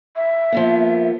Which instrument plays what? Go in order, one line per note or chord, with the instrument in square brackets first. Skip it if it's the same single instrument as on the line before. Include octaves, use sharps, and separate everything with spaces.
[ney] E5
[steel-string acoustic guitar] F3 A#3 B3